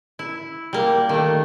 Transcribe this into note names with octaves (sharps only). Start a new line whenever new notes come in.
E4
G3 A#3
D#3 A3